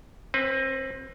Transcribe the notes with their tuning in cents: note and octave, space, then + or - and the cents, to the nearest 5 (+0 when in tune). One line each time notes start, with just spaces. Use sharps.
C4 +30 B4 +0